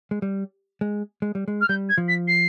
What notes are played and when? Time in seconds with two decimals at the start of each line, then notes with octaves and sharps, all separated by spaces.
0.11 G#3
0.22 G3
0.81 G#3
1.22 G#3
1.35 G3
1.48 G#3
1.61 F6
1.68 G3 G6
1.89 G#6
1.98 F3
2.08 B6
2.27 C7